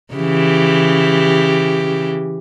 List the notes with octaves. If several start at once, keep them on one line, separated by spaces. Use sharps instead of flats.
C#3 E3 G4